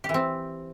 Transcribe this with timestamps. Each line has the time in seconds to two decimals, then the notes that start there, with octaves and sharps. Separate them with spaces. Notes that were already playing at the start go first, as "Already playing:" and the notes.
0.04 G4
0.09 E3
0.14 C4